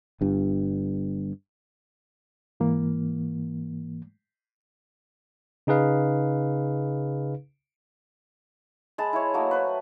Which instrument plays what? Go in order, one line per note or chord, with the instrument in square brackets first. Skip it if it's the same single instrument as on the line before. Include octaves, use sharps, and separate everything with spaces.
[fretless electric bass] G1 G2
[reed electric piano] G#2 E3 A#3
[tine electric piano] C#3 D#4 G#4 B4 F5
[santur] G#3 A5 B5
E4 C#5
F#3 A3 A#3 D#5
B4 C5